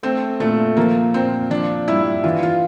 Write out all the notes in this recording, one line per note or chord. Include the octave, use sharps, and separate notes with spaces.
A3 C4
A#2 A3
F3 A#3
A#2 C4
F3 D4
G2 E4
E3 F4
F4